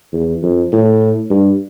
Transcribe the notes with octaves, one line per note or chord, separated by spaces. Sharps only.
E2
F2
A2
G2